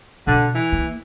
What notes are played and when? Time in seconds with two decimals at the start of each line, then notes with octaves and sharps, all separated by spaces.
0.27 B2 D3
0.54 E3
0.72 A#3